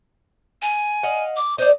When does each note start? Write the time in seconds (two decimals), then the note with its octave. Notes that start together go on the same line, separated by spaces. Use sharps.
0.62 G#5
1.03 D#5 F5 F#5
1.37 D6
1.58 D#4 C5 D5